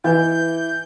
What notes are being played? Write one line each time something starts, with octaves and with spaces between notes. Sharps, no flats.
E3 B4 D#5 G6